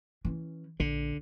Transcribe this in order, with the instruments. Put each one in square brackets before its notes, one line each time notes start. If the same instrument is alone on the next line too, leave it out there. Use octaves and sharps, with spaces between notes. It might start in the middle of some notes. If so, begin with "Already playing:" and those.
[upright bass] E3 C#4
[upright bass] A#1 [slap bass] D3